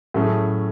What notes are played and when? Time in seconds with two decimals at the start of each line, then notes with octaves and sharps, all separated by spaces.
0.14 A2 F#3 A3 C#4 G#4